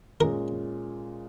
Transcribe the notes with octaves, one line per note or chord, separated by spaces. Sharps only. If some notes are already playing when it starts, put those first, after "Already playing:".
A#2 G#3 C#4 A#4